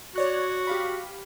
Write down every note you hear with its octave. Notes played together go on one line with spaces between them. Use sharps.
F#4 C#5 D5 F#6
G4 F5 B5